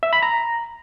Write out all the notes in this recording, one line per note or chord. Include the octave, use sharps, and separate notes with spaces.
E5
B5
A#5